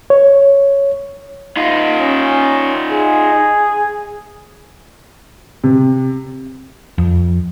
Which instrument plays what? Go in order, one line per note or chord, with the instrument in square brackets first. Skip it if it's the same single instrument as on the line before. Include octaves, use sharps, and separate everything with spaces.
[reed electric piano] C#5
[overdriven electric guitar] D#4 F4
[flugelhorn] C#4
G#4
[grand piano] C3
[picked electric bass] F2